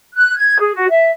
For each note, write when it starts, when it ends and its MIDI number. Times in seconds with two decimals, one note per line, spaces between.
0.14 0.34 90
0.37 0.58 92
0.60 0.72 68
0.75 0.88 66
0.89 1.10 76